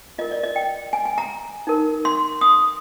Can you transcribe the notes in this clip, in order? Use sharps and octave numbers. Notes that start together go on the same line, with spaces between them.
F4 A#4 D#5
D5
D#5
G5
G#5
G#5
A#5
D#4 A#4
C6
D#6